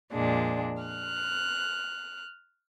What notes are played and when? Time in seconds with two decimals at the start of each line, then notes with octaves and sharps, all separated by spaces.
0.12 F2 A#2 G#3 D4
0.82 F6 F#6